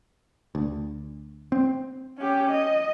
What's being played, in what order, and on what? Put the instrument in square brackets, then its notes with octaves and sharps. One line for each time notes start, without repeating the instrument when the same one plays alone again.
[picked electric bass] D2
C4
[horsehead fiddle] C#4 G4
D#5